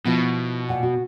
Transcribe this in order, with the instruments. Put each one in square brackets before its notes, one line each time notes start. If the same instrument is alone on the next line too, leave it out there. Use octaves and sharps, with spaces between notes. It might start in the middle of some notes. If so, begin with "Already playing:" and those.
[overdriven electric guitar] B2 [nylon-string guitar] F3 B3 E4
[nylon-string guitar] A#2 F#5
F#4